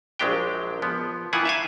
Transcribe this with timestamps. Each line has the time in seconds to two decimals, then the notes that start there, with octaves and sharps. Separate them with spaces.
0.19 A#1 F#3 G#3 D4 G4 G5
0.82 F3 B3
1.33 D#3 E3 E4 F4 F#5 G#5
1.45 E5 F5 G#5